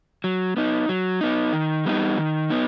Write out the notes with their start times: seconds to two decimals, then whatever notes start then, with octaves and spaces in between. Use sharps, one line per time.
0.24 F#3
0.57 B3 D#4
0.89 F#3
1.21 B3 D#4
1.53 D#3
1.86 G3 B3 D#4
2.18 D#3
2.50 B3 D#4